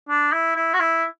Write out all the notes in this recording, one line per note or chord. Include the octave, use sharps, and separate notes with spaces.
D4
E4
E4
F#4
E4